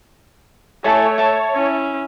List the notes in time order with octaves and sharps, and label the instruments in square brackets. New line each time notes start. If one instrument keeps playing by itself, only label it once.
[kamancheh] A3 [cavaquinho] E4 A4 G#5 [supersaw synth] C#5
[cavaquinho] E5 A5
[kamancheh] C#4 E4